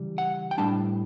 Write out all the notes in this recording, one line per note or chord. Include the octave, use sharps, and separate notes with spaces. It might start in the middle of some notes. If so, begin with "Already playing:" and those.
Already playing: C#3 E3 G3
F#5
G5
A2 G3 D4 A5